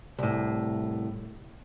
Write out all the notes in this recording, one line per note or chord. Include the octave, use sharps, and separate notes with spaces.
C2 A2